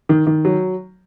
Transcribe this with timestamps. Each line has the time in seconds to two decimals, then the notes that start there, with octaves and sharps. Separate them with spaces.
0.09 D#3
0.27 D#3
0.45 F#3